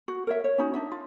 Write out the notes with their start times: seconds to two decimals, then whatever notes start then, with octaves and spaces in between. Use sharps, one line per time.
0.08 F#4
0.27 A#4 C#5 E5
0.44 C#5
0.58 C#4 D#4 F#4
0.74 D4 D#4 E5
0.92 F4